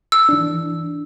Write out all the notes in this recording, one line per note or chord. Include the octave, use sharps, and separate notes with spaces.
E6
E3 D4